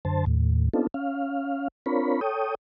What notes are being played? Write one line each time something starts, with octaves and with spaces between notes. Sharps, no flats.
F#2 D3 C5 A5
D#2 A2
B3 C4 D4 D#4 F4 A4
C#4 F5
C4 D4 F4 A#4 C#5 B5
A4 C#5 G5 D#6